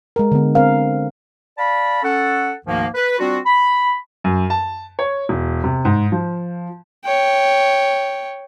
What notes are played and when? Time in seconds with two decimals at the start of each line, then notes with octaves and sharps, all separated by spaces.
0.16 G#3 A#4
0.32 D3 B3
0.55 C4 A#4 F5
1.58 D5 F5 A5 B5
2.03 C#4 A4 F#5
2.66 D2 G#2 D#3 F3 A#3
2.94 B4
3.19 G3 C4 D4 F4 F#4
3.46 B5
4.24 F#2
4.50 A5
4.99 C#5
5.29 E1
5.64 C3
5.85 G#2
6.12 F3
7.05 C#5 G5